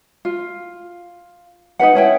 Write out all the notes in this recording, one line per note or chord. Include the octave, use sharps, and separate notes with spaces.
F4
D#4 F#4 B4 F#5
C#4 E4 G5